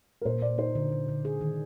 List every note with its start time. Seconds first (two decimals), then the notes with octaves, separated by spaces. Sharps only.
0.21 A#4
0.25 A#2 C5
0.42 A#2 D5
0.58 D#4 C5
0.75 D3
0.92 D3
1.08 D3
1.25 G#4
1.41 D#3